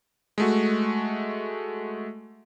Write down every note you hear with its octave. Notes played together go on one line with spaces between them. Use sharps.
G#3 A3 F#4